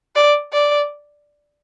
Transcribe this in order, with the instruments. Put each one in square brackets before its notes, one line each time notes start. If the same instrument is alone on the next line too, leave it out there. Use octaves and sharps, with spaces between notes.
[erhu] D5
D5